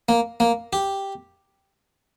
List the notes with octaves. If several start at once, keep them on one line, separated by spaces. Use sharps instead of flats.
A#3
A#3
G4